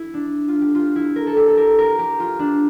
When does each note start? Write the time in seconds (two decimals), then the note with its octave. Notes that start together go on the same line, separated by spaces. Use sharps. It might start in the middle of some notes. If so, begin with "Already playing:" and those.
Already playing: E4
0.14 D4
0.48 F4
0.61 G4
0.75 F4
0.96 E4
1.16 A#4
1.27 A4
1.37 G4
1.47 A4
1.57 A#4
1.79 A#4
1.99 G4
2.20 F4
2.39 D4